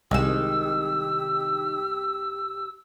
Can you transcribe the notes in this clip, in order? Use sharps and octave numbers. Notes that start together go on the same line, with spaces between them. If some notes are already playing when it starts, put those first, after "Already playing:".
C2 D#3 G#3 G4 E6 E7